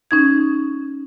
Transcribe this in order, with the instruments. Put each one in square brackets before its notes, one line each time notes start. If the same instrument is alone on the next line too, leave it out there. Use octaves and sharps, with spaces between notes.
[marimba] C#4 D#4 G#6